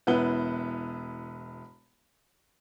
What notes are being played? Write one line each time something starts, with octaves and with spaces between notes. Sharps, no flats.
E1 B3 E4 B4 G7